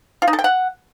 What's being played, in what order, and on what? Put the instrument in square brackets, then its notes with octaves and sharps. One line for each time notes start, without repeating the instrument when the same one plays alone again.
[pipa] F4
D#4
A4
G5
F#5